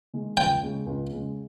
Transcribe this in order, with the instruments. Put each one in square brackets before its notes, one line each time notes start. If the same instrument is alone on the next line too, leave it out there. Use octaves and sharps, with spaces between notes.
[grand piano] D#3 G#3
[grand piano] C#2 [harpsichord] G5
[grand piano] C#3 G#3
C#2
C#3 G#3